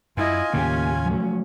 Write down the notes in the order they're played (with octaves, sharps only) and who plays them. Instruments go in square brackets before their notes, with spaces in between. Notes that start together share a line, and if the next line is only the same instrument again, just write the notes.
[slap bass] F#2 [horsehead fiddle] E4 D#5 [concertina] F4 G#5
[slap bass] D#2 A2 C#3 [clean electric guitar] A#3 G4 [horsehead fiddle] C#4
[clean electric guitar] F3 F#3 A3